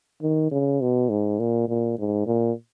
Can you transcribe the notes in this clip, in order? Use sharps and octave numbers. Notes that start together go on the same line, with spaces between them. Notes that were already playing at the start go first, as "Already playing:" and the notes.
D#3
C#3
B2
G#2
A#2
A#2
G#2
A#2